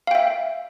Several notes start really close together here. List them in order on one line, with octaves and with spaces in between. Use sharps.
F5 G5 E5